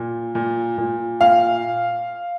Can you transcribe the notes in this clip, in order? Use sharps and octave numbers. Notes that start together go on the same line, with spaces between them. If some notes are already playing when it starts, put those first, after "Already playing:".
Already playing: A#2
A#2
A#2
A#2 F5